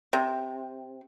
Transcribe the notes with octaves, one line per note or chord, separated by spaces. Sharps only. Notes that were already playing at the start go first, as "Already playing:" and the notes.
C3